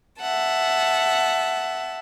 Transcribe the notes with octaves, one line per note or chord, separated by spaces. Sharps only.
E5 F#5 A5